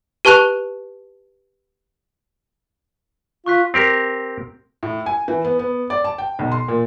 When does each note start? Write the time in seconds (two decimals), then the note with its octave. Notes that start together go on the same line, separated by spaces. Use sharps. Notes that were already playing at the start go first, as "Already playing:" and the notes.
0.25 G4 B4 A5 C#6 F#6 F7
3.46 F4 C#6 F#6 B6
3.74 C4 G4 A#4
4.83 A2
5.06 G#5
5.28 E3
5.45 B3
5.59 B3
5.90 D5
6.04 A5
6.18 G5
6.39 B1
6.52 C6
6.68 A#2